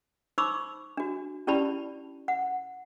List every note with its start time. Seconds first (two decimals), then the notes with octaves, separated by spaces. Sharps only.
0.38 D#4 C5 B5 C#6 D6 E6
0.97 D4 F#4
1.47 C#4 E4 G4 D5 A5 B5
2.28 F#5